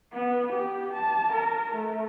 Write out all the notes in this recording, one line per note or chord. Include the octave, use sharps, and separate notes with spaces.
B3
G4
A5
A#4
A3